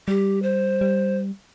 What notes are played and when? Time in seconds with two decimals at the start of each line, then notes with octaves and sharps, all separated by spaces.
0.08 G3 G4
0.42 C5
0.81 G3